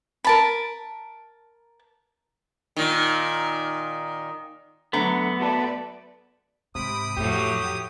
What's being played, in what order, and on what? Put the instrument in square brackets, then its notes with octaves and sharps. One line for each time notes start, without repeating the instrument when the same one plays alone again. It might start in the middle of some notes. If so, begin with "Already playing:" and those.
[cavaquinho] A#4 A5 B5
[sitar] A#2 D#3
[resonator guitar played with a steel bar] D3 A#5 [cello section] F#3 [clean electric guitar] A3 [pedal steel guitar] B3
[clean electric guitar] B2 A3 A4 [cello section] B4 D5
[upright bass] G#2 [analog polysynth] C3 B5 D7 [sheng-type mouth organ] D#6
[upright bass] F2 [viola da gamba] A2 F#3 [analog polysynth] G4